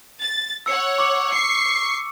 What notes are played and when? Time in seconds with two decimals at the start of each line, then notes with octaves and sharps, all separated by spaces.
0.22 A6
0.66 C#5 F#5 E6 C#7
0.98 C#6 D6
1.32 C#6 C7 C#7